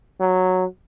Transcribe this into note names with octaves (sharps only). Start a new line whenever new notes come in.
F#3